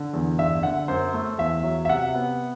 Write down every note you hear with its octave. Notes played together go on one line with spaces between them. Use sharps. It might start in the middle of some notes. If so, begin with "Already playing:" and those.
Already playing: D3
E2
G1 E5
D3 F#5
F#2 C5
A3
E2 E5
F#3
E5
C3 F#5
B3